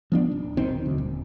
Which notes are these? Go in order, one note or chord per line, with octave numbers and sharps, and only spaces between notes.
F3 B3 D4
D1
D#1 B1 D#3 C4
D2
D#1